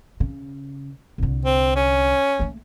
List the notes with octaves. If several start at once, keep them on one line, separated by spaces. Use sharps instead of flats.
C#3
C2 D3
C4
C#4
A3 A#3